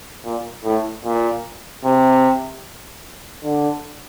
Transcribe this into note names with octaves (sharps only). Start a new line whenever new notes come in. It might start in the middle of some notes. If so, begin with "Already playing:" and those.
A#2
A2
A#2
C3
D3